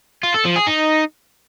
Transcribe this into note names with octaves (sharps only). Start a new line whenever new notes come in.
F4
A4
F3
G#4
D#4